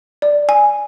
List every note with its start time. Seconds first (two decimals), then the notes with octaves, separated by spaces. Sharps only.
0.22 D5
0.49 G#5